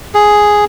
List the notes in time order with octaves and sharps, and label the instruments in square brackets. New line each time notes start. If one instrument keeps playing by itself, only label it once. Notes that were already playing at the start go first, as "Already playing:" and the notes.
[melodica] G#4